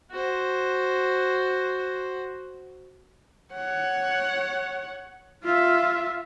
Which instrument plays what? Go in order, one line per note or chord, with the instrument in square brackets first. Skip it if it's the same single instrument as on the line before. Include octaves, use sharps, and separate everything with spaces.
[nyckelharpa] F#4 C5
[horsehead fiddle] C#5 F#5
F4 E5